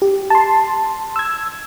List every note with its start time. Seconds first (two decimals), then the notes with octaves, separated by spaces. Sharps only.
0.02 G4
0.30 A5 C6
1.16 E6 G#6